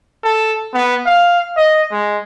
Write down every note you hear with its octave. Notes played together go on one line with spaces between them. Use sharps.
A4
B3
F5
D#5
G#3